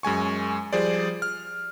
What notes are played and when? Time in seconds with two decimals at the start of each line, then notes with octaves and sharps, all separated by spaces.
0.03 F#2 G#3 G#5 C#6
0.73 F3 G3 G#4 C5 D5
1.22 F6